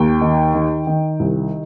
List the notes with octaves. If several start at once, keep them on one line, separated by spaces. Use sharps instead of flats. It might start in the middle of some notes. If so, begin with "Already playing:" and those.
Already playing: D#2 G5
D#3
D#3
D#3
C2